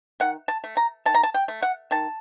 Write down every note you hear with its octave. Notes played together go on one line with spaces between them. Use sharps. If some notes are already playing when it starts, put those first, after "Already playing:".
D#3 F#5
A5
A3
A#5
D#3 A5
A#5
A5
G5
A3
F#5
D#3 A5